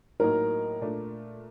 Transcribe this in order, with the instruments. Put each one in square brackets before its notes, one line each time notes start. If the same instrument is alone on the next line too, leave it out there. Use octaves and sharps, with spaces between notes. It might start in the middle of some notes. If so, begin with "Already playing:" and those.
[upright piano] A2 F#3 A#3 D#4 [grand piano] A#4
[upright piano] A#2 A3 D4